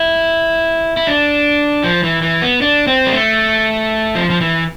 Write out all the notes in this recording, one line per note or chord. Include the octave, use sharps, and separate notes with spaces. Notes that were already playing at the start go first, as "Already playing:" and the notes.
Already playing: E4
E4
D4
F3
E3
E3
B3
D4
C4
G3
A3
F3
F3
E3